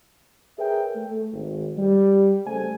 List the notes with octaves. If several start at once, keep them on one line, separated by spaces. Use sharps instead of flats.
G#4 A#4 B4 C#5 E5 G5
A3
G#1
G3
C#3 A3 C5 G#5